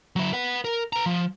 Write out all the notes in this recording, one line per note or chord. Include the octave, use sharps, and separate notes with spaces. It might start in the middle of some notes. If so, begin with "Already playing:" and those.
F#3 E4
B4 F#5
A#4
B4 A#5
F3